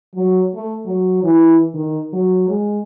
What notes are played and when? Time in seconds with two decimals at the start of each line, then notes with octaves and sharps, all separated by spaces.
0.16 F#3
0.55 A3
0.86 F#3
1.23 E3
1.74 D#3
2.13 F#3
2.49 G#3